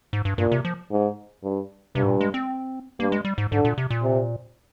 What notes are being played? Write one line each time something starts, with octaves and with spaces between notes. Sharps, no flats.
G#2
G2
G2 A#2
C3
F3
G#2
G2
G2 C3
G#2
A#2
G#3
C4
G2 A#3
G#3
G3
G#2
G#2 D3
A#2
C3
A#2
C3